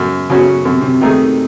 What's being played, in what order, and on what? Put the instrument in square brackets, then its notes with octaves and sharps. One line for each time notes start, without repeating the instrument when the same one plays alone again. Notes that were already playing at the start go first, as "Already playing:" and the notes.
Already playing: [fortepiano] F#2 [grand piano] C#3
[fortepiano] C#3 F#3 C#4 F#4
[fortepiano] F#2 [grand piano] C3
[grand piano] C3
[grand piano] C3 [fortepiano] D#3 A3 D#4 G#4